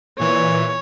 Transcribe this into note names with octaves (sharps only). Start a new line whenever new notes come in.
A#2 E3 C#5